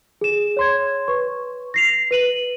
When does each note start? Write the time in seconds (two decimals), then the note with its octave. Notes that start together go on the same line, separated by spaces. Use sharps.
0.21 G#4 E7
0.57 C#5 C6 G#6
1.08 B4 C#6
1.74 A#6 C7 F7
2.11 B4 D#7 F#7